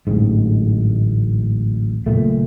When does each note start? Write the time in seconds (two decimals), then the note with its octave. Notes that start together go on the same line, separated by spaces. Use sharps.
0.07 D1 A1 G#2
2.06 F#1 A#2 A3